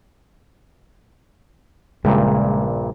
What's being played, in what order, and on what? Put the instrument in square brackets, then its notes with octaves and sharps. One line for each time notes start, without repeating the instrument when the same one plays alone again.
[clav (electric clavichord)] A#1 G2 A#2 [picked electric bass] C#3 G3 [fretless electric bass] G#3